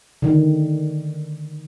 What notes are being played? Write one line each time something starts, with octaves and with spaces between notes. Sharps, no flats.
D3 D#3